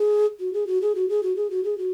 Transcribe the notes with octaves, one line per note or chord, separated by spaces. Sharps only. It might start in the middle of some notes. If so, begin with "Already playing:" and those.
Already playing: G#4
F#4
G#4
F#4
G#4
F#4
G#4
F#4
G#4
F#4
G#4
F#4